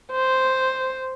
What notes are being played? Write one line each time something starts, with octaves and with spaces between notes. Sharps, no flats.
C5